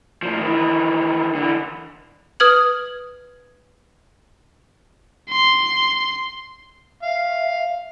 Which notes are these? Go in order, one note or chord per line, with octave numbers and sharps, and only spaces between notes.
A2 F3
D#3 E3
D3 E3
B4 D#6 F6 G#6 F#7
C6
E5 F5